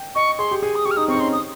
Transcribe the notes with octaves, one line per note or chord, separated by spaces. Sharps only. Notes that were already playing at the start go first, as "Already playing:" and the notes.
Already playing: G5
D#5 C#6
G#4 C6
G4
G#4 G#5
D#6
G4 C#6
F6
D#4 D#6
C4 C#6
D#4
C#4 C6
D#6